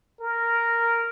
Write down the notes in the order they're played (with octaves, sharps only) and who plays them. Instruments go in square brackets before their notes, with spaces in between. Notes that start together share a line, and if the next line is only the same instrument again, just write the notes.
[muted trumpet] A#4